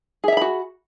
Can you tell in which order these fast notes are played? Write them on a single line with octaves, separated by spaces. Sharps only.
G#4 E5 A#5 B5 F#4